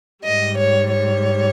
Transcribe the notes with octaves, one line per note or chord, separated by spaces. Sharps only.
G#2 G3 D#5
C#5
C#5